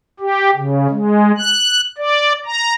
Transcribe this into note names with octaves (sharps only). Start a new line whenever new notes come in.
G4
C#3
G#3
F#6
D5
A#5